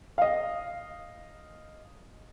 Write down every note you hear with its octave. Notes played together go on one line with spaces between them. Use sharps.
D#5 F5